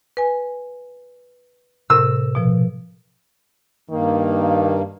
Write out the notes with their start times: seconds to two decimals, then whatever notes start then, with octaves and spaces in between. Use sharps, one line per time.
0.17 B4 G#5
1.90 A2 C3 A#4 E6
2.35 B2 F3
3.90 G2 D#3 A#3